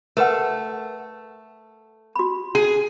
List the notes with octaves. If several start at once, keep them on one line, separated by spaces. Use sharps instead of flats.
A3 A#4 B4 F#5
F#4 B5
G#4